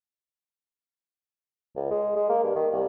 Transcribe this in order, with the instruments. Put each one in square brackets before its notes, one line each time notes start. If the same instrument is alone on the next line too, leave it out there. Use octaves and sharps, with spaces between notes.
[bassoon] C#2
G#3
G#3
A#3
G2
D#3
C2